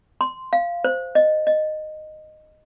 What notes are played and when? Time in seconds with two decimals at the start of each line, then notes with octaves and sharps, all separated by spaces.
0.21 C6
0.53 F5
0.84 C5
1.15 D#5
1.47 D#5